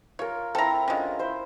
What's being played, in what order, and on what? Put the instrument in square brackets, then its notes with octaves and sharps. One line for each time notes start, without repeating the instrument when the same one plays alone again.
[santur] F4 A#4 [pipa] C#5
[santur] C4 E4 [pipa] A4 A#5
[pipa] D3 G#3 [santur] C#4 F4
[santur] E4 C5